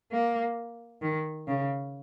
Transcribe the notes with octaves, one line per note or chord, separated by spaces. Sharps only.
A#3
D#3
C#3